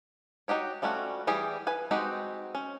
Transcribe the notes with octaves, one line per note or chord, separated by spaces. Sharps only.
D#4 F#4 G4 C#5
F3 G3 A3 C#4 F#4
E3 G3 G4 G#4
B4 G#5
G#3 C4 D#4 F#4 G4
C#4